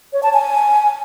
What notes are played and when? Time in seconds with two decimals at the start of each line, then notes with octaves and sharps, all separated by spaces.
0.13 C#5
0.23 A5
0.33 G#5